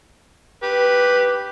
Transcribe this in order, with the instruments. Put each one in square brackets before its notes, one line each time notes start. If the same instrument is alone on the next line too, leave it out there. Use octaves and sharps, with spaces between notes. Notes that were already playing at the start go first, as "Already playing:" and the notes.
[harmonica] G4 B4